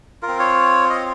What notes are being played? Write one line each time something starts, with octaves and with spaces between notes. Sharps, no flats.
F4 A#4
C4
C#5
D#5